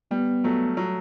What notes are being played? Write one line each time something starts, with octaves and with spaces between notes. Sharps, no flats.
G3 B3
F#3 A3
F#3